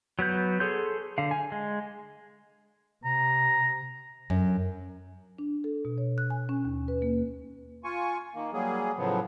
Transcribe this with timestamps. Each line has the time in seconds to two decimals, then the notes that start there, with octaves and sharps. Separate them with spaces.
0.19 F#3 B3 B4 G6
0.60 G#4 A4 C#5 C6 G6
1.18 D3 F5
1.31 G#5
1.52 G#3
3.05 C3 A#5
4.30 F#2
5.39 D4
5.64 A4
5.85 B2
5.98 C#5
6.18 F#6
6.30 G#5
6.49 C#4
6.65 D#2
6.88 B4
7.02 A#3
7.84 F4 G#5 C#6
8.35 D#3 A#3
8.53 F#3 G3 A#3 G#4
8.98 A2 C#3 F3 F#3 B3